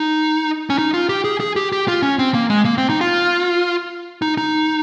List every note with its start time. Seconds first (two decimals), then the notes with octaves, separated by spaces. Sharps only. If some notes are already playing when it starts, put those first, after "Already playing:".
Already playing: D#4
0.70 C#4
0.78 D#4
0.94 F4
1.09 G4
1.24 G#4
1.40 G#4
1.56 G4
1.72 G4
1.88 F4
2.02 C#4
2.19 C4
2.34 A#3
2.50 G#3
2.65 A#3
2.78 C4
2.90 D#4
3.01 F4
4.22 D#4
4.37 D#4